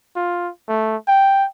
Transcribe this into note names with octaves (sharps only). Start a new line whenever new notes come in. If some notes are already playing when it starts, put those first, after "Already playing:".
F4
A3
G5